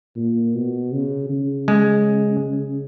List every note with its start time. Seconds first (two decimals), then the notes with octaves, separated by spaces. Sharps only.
0.16 A#2
0.54 B2
0.92 C#3
1.30 C#3
1.68 G#3